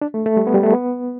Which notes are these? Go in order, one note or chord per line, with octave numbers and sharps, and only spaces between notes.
D4
A3
A3
G3
B3
G3
A3
B3